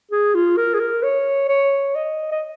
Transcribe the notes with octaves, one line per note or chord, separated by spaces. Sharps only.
G#4
F4
A#4
G#4
A#4
C#5
C#5
D#5
D#5